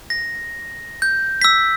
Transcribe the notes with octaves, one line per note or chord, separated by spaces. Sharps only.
A#6
G6
E6 B6